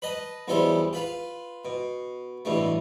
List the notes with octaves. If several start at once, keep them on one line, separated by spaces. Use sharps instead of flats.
B4 D#5 A5
B1 E2 E3 G3 A4 C5
F4 B4 F5
B2
A1 G2 B2 A3